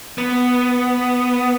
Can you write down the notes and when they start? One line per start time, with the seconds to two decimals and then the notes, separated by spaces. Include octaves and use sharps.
0.18 B3